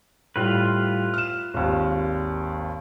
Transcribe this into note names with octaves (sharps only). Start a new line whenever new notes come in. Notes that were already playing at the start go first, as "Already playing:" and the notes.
A2 G3 F4 B4
F6 E7
G#1 D#2